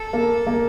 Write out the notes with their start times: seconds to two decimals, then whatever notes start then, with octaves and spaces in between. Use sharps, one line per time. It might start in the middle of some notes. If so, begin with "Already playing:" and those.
Already playing: A4
0.13 A#3
0.47 A#3